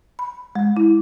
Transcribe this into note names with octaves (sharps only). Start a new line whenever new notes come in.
B5
G#3
E4